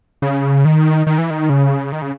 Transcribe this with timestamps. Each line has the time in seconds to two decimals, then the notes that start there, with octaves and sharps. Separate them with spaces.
0.22 C#3
0.65 D#3
1.07 D#3
1.18 E3
1.30 D#3
1.50 C#3
1.92 D#3
2.02 C#3